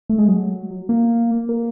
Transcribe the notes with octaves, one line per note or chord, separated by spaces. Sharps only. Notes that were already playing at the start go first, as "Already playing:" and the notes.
A3
G#3
F#3
A#3
A#3